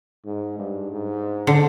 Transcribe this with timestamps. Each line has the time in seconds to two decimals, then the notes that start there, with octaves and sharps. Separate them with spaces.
0.25 G#2
0.58 G2
0.92 G#2
1.47 D3